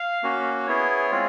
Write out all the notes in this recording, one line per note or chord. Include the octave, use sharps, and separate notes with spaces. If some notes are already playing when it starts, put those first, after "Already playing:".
Already playing: F5
A#3 C#4 F#4
B3 E4 G#4 C#5
G#3 C4 F4 G#4